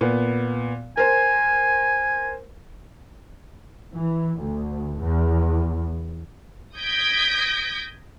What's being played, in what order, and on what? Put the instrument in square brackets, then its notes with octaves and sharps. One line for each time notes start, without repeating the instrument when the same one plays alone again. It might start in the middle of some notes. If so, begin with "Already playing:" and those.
[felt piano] A#2 B3
[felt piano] A#4 C5 [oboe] G#5
[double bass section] E3
D2
E2
[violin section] D#6 G6 G#6 A#6 B6 D7